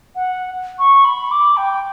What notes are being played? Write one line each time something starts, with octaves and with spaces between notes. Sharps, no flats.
F#5
C#6
B5
D6
G5